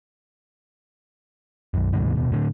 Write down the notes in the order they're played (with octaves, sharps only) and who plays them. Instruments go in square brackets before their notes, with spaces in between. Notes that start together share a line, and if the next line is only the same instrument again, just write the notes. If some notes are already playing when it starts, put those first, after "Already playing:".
[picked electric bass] B1 F#2
C#2 G2 B2 D#3
D#1 B2
A2 D3